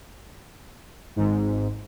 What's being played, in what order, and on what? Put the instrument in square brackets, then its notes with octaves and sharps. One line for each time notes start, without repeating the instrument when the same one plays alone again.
[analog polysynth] G#1 G#2